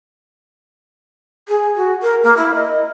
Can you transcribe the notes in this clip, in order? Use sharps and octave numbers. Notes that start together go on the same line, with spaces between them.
G#4
F#4
A#4
A#3
E4
D#5